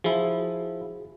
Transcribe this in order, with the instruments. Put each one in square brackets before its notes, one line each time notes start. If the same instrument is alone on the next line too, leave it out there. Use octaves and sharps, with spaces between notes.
[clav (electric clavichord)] F3 E4 [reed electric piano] F#4 G#4